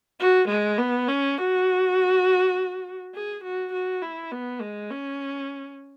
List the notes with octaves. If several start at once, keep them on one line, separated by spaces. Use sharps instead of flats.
F#4
G#3
B3
C#4
F#4
G#4
F#4
F#4
E4
B3
G#3
C#4